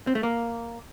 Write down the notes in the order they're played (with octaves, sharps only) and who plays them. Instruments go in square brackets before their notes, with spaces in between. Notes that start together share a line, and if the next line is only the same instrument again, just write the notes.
[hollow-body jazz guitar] C4
A3
A#3